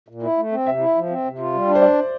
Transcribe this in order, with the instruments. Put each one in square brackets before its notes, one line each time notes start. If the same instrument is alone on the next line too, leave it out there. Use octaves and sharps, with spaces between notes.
[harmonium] A#2
E4
A3
C4
[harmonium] C3 [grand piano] E5
[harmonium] E4
F3
C4
C3
F4
G3
D4
[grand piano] C5
[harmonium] D2 [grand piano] D5